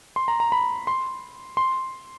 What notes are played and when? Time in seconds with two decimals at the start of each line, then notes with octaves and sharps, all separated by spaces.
0.16 C6
0.28 A#5
0.40 A#5
0.52 B5
0.87 C6
1.57 C6